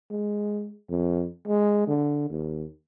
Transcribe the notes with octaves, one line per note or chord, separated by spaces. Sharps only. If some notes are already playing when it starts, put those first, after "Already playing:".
G#3
F2
G#3
D3
D#2